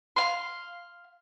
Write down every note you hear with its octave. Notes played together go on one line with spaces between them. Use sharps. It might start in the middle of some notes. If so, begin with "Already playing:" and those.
F5 C6